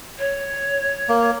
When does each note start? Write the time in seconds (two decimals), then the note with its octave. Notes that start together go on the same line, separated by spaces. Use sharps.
0.19 C#5
1.09 A#3